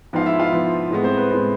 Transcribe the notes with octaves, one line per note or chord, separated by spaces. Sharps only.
G#2 F3 B3 F5
E4 E5
F4 F5
G#2 F3 B3
A2 G#3 B3
C4 C5
B4
A2 G#3 B3